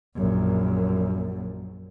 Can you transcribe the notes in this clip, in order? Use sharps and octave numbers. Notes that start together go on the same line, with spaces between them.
A#1 F#2